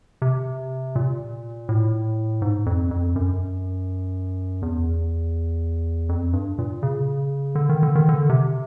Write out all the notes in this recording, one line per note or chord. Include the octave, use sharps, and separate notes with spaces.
C3
A#2
A2
G#2
F2
F2
F#2
E2
F2
G2
A#2
C#3
D3
D#3
D3
D#3
D3
C3